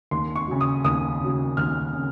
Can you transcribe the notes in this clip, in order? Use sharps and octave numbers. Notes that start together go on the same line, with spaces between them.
D#2 C6
C#6
C#3 F#3
D#6
D#2 D#6
C#3 F#3
D#2 F6
C#3